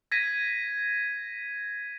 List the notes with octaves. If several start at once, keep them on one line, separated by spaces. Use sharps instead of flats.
G#6 A#6 B6 D#7